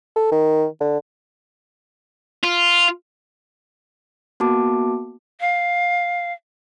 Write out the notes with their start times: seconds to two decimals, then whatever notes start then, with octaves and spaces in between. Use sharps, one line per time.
0.16 A4
0.32 D#3
0.81 D3
2.43 F4
4.40 A#3 B3 F#4 A5 D6
5.40 F5